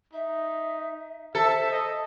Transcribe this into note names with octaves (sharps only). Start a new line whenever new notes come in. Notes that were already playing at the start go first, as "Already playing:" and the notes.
D#4 E5
A4 C5 E5
D#5